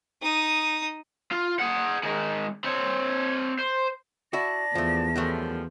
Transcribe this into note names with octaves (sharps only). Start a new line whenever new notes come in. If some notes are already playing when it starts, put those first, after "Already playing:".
D#4 D#6
F4
G#4 F#5
D#3 G#3
C4 C#5
C5
E4 F#4 D5 A5 A#6
E2 F3 A3
F#2 E3 F3 G3 A3